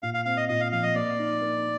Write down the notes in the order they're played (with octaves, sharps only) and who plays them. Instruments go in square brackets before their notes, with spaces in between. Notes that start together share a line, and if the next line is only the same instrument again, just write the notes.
[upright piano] A#2 [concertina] F5
[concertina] F5
[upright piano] C4 [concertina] F5
[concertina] D#5
[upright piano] A#2 [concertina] D#5
[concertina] F5
[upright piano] F3 [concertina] F5
[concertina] D#5
[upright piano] A#3 [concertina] D5
[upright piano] D#4
A#3